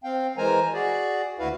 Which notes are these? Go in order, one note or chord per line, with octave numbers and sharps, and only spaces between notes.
C4 F5 G5
E3 G#3 A#4 C5 G#5 A#5
F#4 G#4 D5
D2 E4 F#4 B4 F5